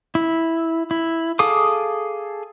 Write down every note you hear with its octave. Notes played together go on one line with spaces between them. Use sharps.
E4
E4
G#4 A4 F5 D6 D#6